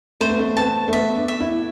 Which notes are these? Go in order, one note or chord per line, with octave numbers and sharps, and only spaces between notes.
A3 C5
B3
A3
B3 A5
A3
B3 E5
D4
E5
E4